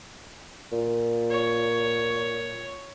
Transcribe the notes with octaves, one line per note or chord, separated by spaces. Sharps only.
A#2
C#5